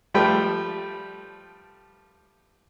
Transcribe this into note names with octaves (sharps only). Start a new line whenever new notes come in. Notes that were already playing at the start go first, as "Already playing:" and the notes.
F3 G3 A3 B4 G5